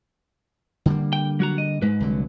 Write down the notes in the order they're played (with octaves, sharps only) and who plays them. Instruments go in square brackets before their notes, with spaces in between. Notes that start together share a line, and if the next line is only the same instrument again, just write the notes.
[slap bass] D3 G3 A#3
[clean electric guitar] G5
F#3 F#4 A#5
D#5
[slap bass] G#2 [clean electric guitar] G#3 B4
[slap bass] C2 D3 F#3